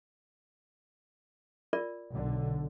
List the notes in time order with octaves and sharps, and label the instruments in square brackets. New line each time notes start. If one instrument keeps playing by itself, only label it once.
[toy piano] F4 A#4 D5
[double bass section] B1 D3